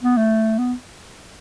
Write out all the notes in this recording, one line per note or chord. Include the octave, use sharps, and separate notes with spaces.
B3
A3
B3